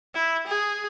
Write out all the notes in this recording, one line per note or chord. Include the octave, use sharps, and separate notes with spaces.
E4
G#4